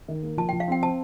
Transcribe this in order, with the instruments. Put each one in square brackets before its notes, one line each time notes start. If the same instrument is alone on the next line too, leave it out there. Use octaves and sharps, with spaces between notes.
[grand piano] D#3
A#3
[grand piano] F3 [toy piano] A5
[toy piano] G5
[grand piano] F3
[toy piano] F5
[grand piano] C4 [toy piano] G5
[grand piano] C5 [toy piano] A5